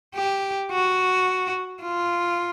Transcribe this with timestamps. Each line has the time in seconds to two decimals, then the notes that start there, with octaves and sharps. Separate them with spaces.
0.15 G4
0.71 F#4
1.82 F4